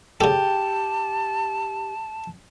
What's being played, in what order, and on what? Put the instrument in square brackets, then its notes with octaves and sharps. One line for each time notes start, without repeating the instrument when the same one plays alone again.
[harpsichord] C#3 A4 [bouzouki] G4 [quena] A5